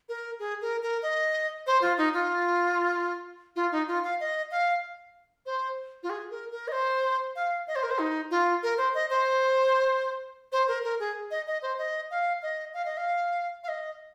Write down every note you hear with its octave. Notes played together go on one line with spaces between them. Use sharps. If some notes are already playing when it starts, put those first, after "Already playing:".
A#4
G#4
A#4
A#4
D#5
C5
F4
D#4
F4
F4
D#4
F4
F5
D#5
F5
C5
F4
G#4
A#4
A#4
D#5
C5
F5
D#5
C5
A#4
C5
D#4
F4
A#4
C5
D#5
C5
C5
A#4
A#4
G#4
D#5
D#5
C5
D#5
F5
D#5
F5
D#5
F5
F5
D#5